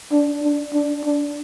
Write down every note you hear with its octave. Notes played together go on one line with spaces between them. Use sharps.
D4
D4
D4
D4